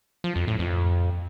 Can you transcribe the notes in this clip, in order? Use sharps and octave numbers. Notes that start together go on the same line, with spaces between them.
F3
F2
A2
F2